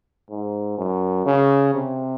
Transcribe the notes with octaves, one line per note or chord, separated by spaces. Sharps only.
G#2
F#2
C#3
C3